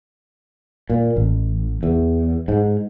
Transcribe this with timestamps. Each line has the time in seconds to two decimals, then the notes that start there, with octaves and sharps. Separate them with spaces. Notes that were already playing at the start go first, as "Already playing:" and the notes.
0.90 A#2
1.16 A1
1.83 E2
2.48 G#2